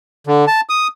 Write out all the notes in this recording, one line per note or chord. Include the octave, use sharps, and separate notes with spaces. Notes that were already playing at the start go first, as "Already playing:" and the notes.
D3
A5
D#6